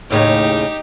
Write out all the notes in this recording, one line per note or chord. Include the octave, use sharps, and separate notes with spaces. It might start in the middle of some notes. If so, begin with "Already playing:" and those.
D#2 A2 C#3 D#4 G4